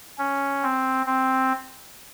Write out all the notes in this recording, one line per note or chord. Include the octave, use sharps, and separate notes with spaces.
C#4
C4
C4